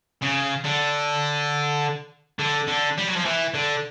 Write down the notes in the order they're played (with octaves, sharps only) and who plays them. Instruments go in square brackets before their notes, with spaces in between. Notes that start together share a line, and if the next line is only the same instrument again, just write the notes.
[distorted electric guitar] C#3
D3
D3
D3
G3
F#3
F3
E3
D3